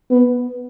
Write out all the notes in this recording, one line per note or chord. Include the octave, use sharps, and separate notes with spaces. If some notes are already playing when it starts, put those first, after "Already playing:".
B3